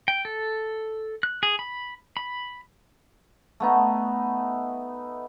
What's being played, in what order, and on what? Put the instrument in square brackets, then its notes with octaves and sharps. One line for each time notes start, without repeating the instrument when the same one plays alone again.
[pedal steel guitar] G5
A4
F#6
G#4
B5
B5
[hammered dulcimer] A3 B3 D#4